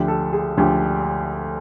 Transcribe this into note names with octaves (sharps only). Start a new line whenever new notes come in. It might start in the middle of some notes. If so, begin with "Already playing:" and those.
Already playing: D2 D3 F3 G4
A4
G#4
D2 D3 F3 G4